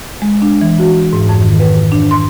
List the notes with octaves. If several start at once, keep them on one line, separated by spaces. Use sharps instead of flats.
G#3
D4
E3
F#4
G#2
F2
D#3
B4
D4
C6